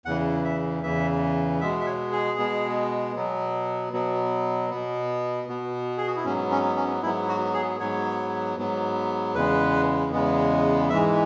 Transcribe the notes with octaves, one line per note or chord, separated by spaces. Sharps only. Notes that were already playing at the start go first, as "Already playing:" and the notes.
E2 C#3 E3 F#5
E5
E2 C#3 E3 E5
B2 G#3 B3 E5
E5
C#5
G#4
B2 G#3 B3
B2 F#3 B3
B2 F#3 B3
B2 B3
B2 B3
G#4
F#4
E4
G#2 F#3 B3 C#4
C#4
C#4
G#2 F#3 B3 E4
F#4
G#4
G#2 F#3 B3 C#5
G#2 F#3 B3
E2 C#3 G#3 B3 B4
E2 C#3 G#3 B3
G#2 E3 G#3 E5